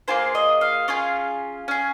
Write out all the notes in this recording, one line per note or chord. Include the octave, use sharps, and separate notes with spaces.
A#3 F4 G#4 C5
D#5
F5
C#4 F4 G#4
C#4 G#4